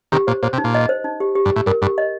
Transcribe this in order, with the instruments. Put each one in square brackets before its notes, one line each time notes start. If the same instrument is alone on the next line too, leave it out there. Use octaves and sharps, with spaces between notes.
[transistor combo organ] C3 D#3 [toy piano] G4
[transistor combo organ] A#2 [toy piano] C5
[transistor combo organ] A#2 [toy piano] C5
[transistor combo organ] C3
[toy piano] D#4
[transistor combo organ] A#2
[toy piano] D#5
C5
D#4
G4
G4
[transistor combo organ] G2
[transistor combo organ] A2 [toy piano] G4
[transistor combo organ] G2 [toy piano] A#4
[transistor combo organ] G2 [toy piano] G4
[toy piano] D#5